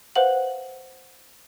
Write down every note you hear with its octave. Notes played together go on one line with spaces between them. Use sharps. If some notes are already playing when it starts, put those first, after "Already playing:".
B4 C5 F5 F#5 F#7